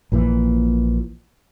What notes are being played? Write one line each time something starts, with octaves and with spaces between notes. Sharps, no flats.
A#1 A#2 C#3 E3